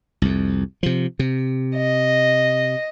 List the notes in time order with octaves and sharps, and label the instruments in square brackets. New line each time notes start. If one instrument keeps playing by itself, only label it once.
[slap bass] C2 F2
C3 F3
C3
[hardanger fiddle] D#5